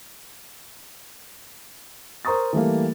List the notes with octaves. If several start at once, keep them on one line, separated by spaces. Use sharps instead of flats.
A#4 C5 A#5 C#6 D#6 A6
E3 G3 A3 A#3